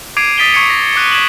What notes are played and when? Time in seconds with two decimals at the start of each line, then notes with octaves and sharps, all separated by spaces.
0.17 D6 G#6 C7 D7 D#7 F7
0.38 D#6 A6 B6 D7 D#7 G7
0.54 C#6 G#6 C7 C#7
0.70 A#6
0.96 D6 F#6 C#7 D#7
1.12 G#6 B6 E7 F#7